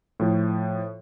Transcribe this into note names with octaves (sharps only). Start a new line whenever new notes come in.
A2 F3